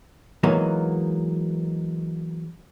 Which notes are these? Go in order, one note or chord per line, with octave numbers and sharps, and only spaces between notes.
E3 F#3 G#3 A#3 B3 D#4